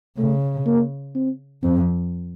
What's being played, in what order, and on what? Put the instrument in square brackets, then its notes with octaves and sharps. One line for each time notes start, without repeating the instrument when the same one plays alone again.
[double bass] C#3 [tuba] A3
[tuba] A#3
C4
[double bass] F2 [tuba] C4